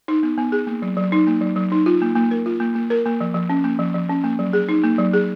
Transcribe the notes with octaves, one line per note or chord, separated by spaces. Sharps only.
D#4
B3
B3
G#4
A#3
F#3
F#3
D#4
A#3
F#3
F#3
D#4
F4
A#3
A#3
A#4
F4
A#3
A#3
A#4
A#3
F3
F3
C#4
A#3
F3
F3
C#4
A#3
F#3
G#4
D#4
A#3
F#3
G#4